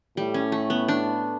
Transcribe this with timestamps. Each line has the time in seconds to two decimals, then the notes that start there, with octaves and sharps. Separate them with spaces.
0.17 A2 G3
0.34 C#4
0.52 A3
0.70 B3
0.88 D4